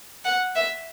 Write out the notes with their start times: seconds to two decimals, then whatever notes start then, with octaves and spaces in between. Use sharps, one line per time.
0.25 F#5
0.55 E5